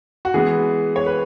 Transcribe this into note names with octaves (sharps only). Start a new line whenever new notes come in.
F#4
E3 G#3 B3 G#4
C#5
B4